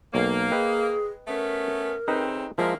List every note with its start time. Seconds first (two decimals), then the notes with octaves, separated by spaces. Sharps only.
0.14 B1 A#3 C#5
0.52 G#4 B4 D#5 G5
1.27 A3 B3 C#4 A#4
2.08 C#3 A3 C4 D#4 B4 G5
2.58 F3 G#3 A#3 E4 A#4